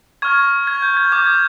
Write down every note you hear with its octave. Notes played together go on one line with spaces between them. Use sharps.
C#6 F6 G#6
G#6
G6
G#6
D6 G6 G#6
G#6